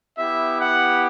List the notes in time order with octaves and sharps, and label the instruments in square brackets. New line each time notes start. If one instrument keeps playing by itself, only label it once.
[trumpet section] B3 E4 G4 E5
F#5